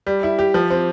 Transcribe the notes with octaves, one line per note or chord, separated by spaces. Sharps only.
G3
E4
G4
F3
C4